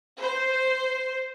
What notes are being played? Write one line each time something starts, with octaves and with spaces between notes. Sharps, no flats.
C5